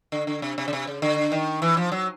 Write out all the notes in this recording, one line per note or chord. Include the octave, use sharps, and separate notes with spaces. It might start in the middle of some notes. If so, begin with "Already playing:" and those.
D3
D3
C3
C3
C#3
C3
C#3
D3
D#3
E3
F3
F#3